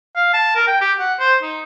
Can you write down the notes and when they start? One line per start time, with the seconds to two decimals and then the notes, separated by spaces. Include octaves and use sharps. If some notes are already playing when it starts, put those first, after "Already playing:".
0.16 F5
0.34 A5
0.56 A#4
0.68 G5
0.81 G4
0.99 F#5
1.19 C5
1.43 D#4